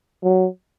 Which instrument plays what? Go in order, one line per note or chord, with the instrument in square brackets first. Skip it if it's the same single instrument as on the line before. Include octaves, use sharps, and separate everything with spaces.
[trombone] F#3